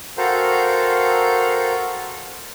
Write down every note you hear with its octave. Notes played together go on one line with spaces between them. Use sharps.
F#4 A4 A#4 C5 F5 G5